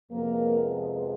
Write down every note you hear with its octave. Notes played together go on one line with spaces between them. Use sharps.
F2 C3 F3 G#3 A#3 B3 A#4